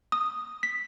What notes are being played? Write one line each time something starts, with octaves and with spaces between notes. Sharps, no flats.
D#6
B6